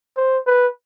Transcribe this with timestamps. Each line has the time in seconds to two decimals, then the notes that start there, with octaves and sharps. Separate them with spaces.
0.17 C5
0.47 B4